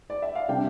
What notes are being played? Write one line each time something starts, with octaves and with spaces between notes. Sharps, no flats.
D5
E5
F5
C3 G3 D4 G5